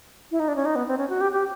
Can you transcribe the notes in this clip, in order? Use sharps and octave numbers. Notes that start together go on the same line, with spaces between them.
E4
D#4
D4
C#4
D#4
B3
C4
C#4
F#4
G4
G4